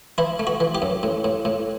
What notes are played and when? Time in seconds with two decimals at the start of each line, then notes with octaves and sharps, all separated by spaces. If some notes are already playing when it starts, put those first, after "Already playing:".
0.18 E3 E4
0.39 A3
0.47 F#4
0.60 E3
0.75 G4
0.82 F#2
1.03 A2
1.24 A2
1.45 A2